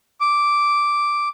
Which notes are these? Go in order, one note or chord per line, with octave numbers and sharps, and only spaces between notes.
D6